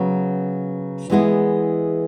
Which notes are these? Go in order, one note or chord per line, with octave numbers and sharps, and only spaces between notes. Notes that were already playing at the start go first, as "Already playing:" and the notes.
Already playing: C#3 F#3 B3
E3 G#3 B3 E4 G#4